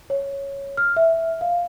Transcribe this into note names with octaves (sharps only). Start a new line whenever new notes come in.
C#5
F6
E5
F5